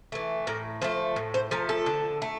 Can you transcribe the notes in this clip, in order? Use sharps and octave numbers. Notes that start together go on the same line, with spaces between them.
E3 A3
A2 A#4
F3 A3 C5
A2
C5
F3 A3 A#4
A4
D3
A3